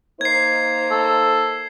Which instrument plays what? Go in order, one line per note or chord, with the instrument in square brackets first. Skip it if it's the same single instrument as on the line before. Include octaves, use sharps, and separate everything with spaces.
[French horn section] A#3 D#4 C5 [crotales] G#6 C7
[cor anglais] A4